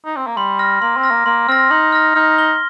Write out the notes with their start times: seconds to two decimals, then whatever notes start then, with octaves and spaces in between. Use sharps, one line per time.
0.05 D#4
0.16 C4
0.27 A#3
0.37 G3 C6
0.59 F6 A#6
0.82 A#3 C6
0.97 C4
1.04 F6 A#6
1.11 A#3
1.26 A#3 C6
1.48 C4 F6 A#6
1.70 D#4 C6
1.92 F6 A#6
2.15 D#4 F6
2.38 A#6 G7